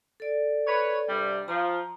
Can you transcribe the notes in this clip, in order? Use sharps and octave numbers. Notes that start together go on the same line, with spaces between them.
A4 D5
B4 C#5
G2 C3 G3
F3 A#5